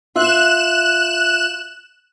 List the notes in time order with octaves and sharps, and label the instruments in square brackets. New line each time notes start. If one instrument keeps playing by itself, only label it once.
[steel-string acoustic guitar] F4 E5 [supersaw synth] F#6 E7